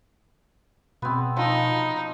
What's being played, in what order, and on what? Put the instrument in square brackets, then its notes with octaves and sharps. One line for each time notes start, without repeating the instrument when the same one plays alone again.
[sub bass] B2 [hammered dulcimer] B3 C4
[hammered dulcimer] F3 [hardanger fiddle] D#4